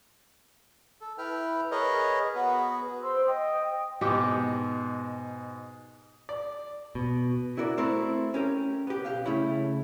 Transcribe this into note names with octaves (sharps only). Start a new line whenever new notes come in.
A4
E4 B4 G5 F6
G#4 A#4 B4 C#5 D#5
B3 F#4 G#4 B4
C5 C6 E6
D#5 G5 D#6
G#2 B2 G4
D5
B2
E4 F#4 A#4 D5
A3 C4 E4 A4 A#4
C#4 G4 A#4
B3 G4
B1 G4 F5
C#3 A3 C#4 E4